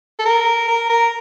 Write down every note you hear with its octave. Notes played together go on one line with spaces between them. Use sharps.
A4
A#4
A#4
A#4